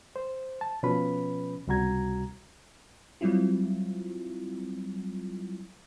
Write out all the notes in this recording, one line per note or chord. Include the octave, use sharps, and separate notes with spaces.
C5
A5
B2 F3 C#4 B4 B5
C#2 C3 G3 F#4 A#5 G#6
F#3 G3 C4 E4 F4